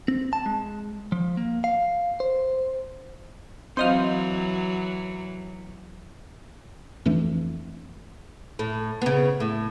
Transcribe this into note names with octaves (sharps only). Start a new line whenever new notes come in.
C4
A5
G#3
F3
A#3
F5
C5
E3 F#3 C4 D#5 F5
F2 E3 A3 D4
A2
C#3 B3
A2